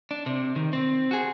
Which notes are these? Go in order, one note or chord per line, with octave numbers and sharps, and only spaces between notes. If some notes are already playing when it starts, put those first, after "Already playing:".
D4
C3
D#3
C4
F#4 G#4